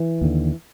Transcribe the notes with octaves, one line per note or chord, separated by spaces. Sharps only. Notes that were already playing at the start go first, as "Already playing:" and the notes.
Already playing: E3
D#2 D3